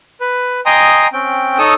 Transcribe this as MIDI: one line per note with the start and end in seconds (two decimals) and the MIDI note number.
0.21 0.60 71
0.66 1.07 75
0.66 1.07 79
0.66 1.07 80
0.66 1.07 82
0.66 1.07 84
0.66 1.07 87
1.13 1.58 60
1.13 1.58 61
1.13 1.58 79
1.58 1.74 63
1.58 1.74 69
1.58 1.74 73
1.58 1.74 87
1.58 1.74 88